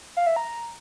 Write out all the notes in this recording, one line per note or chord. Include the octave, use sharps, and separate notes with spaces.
F5
E5
A#5